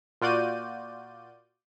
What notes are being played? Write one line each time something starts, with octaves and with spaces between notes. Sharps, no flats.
A#2 F4 F#4 D5 G6 D#7